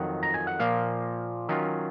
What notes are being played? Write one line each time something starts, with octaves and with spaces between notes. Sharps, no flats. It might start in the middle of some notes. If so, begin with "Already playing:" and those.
Already playing: F2 D#3 F#3 F#5
A#5
G#5
F#5
A#2 F3 A#3 F5
D#3 F#3 C#4 F4